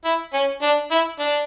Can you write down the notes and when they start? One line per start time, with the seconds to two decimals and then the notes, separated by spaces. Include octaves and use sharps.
0.05 E4
0.34 C#4
0.62 D4
0.91 E4
1.19 D4